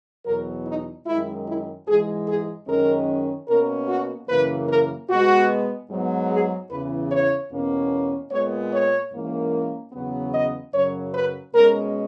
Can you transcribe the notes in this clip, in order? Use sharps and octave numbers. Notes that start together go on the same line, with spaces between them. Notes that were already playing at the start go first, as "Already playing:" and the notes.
E2 B2 F#3 A#4
D#4
F#2 D#3 G#3 E4
E4
G#2 E3 G#3 G#4
G#4
F#2 D#3 G#3 C#4 A#4
B2 A#3 C#4 A#4
F#4
F#2 C#3 E3 A#3 B4
A#4
B2 G#3 B3 F#4
G#2 F#3 B3
G#4
E2 C#3 E3 B4
C#5
E2 B2 A#3 C#4
A#2 G#3 B3 C#5
C#5
G#2 E3 A#3 C#4
E2 C#3 F#3 B3
D#5
F#2 C#3 F#3 C#5
B4
B2 G#3 C#4 A#4